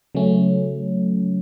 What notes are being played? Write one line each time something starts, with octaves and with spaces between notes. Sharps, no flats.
C#3 F#3 A3 C#4